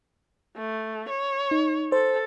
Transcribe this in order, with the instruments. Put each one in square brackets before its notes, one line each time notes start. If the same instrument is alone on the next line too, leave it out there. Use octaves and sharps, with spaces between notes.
[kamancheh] A3
C#5
[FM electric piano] D#4
[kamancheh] A4 [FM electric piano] C5